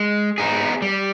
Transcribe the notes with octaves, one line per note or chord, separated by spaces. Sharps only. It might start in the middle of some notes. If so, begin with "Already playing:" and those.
Already playing: G#3
B3 D#4 G#4
G3